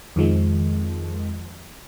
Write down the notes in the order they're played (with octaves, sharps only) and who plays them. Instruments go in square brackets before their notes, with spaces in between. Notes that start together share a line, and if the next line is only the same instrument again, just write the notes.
[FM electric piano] F2 D#3 F3 G#3